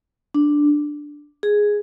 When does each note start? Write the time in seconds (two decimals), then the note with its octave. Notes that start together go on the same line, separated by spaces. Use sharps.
0.34 D4
1.43 G#4